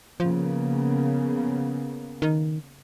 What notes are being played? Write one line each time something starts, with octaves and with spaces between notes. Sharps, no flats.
C#3 F3 A#3 B3
D#3